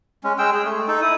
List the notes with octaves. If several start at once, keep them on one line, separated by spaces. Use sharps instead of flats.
G#3 C#4
G#3 G#4 G5 E6
G#4
A3
D#4 A4
E4 D#6